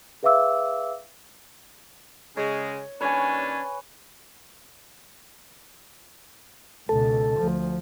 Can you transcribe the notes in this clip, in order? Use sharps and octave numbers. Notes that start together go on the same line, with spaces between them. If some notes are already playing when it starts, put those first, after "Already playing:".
G#4 B4 E5 F5 D6 E6
C#3 G#3 C#5
D#2 C#4 D4 B4 C#5 G#5
C#2 B2 A4
D2 F3